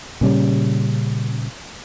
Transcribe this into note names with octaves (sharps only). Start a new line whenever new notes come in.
A#2 C#3 G3 C#4